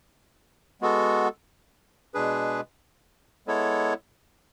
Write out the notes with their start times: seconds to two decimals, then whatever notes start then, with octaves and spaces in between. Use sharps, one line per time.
0.81 G#3 B3 F#4 A4
2.14 B2 G#3 D4 G#4 B4
3.47 G#3 B3 E4 A4 C#5